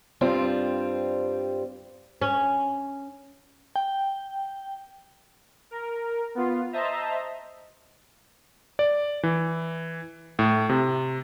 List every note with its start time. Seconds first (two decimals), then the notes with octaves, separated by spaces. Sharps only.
0.21 G2 G3 C4 F4
2.22 C#4
3.76 G5
5.71 A#4
6.35 B3 F4
6.72 C5 D#5 E5 A5 A#5
8.79 D5
9.23 E3
10.39 A2
10.69 C3